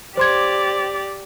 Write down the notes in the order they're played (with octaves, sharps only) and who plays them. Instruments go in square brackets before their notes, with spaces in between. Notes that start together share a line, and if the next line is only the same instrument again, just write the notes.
[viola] G4 D5 [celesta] C5 C6 G#6